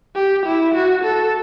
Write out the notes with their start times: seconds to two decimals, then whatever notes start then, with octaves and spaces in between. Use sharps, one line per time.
0.16 G4
0.46 E4
0.75 F#4
1.04 A4